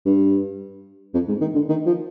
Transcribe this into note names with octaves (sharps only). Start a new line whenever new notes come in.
G2
F2
G#2
D#3
D3
D#3
F3